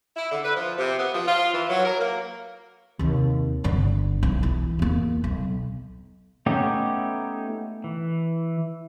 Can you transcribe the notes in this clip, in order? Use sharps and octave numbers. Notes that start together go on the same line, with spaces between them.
E4
D3
B4
F3
C3
B3
F3
F4
E3
F#3
A#4
A#3
D#2 C3
G1 D3
B1
E3
E2 A#3
B1
A3 B3 C#4 D#4 G4
E3